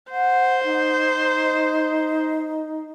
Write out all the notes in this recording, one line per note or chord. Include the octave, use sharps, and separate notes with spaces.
C5 F#5
D#4